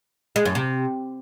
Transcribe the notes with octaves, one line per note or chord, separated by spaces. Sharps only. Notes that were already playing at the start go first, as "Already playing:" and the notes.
G#3
F#2
C3